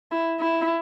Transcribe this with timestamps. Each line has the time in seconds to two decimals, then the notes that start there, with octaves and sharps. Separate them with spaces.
0.11 E4
0.40 E4